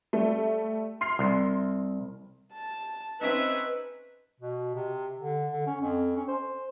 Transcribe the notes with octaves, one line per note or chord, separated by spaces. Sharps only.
G3 A3
C6 F6 C7
C2
A5
C4 C#4 D#4 B4 E5
B2
C3
D3
D3
C#4
F2
C#4
C5